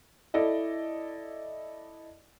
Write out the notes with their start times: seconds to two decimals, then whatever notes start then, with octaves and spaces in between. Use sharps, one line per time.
0.34 E4 A4 D5 D#5